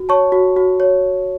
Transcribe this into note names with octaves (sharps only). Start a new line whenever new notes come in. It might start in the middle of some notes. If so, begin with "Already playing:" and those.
Already playing: F#4
C#5 A5 C#6
F#4
F#4
C#5